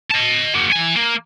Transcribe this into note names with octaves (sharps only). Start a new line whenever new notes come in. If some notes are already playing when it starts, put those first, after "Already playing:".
D#5 A5
F#3 A#3
E3 G#5
A#3